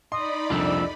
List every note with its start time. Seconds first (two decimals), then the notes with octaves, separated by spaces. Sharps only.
0.12 D#4 D5 D#5 B5 C6
0.50 C2 F2 F3 D4 F4 E6